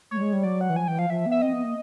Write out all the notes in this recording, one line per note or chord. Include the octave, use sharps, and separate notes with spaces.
A3 C#5
G3
G#3
G3
F#3 D5
F#5
E3
F3 G#5
E3 G5
F3 F5
F3 E5
B3
E5
C4 D#5
B3
A#3